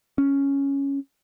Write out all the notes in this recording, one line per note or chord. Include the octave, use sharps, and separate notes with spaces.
C#4